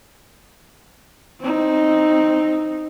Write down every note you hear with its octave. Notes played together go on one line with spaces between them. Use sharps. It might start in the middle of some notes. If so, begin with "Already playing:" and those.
C4 D#4